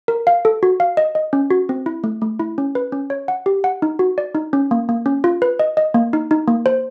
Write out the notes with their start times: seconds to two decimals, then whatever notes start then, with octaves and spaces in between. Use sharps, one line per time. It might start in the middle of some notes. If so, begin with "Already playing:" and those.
0.08 A#4
0.27 F5
0.45 A4
0.63 F#4
0.80 F5
0.97 D#5
1.15 D#5
1.33 C#4
1.50 F#4
1.69 C4
1.86 E4
2.04 A3
2.22 A3
2.40 E4
2.58 C#4
2.75 B4
2.92 C#4
3.10 C#5
3.28 F#5
3.46 G4
3.64 F#5
3.82 D#4
3.99 F#4
4.18 D5
4.35 D#4
4.53 C#4
4.71 A#3
4.89 A#3
5.06 C#4
5.24 F4
5.42 B4
5.59 D#5
5.77 D#5
5.94 A#3
6.13 D#4
6.31 D#4
6.48 A#3
6.66 C5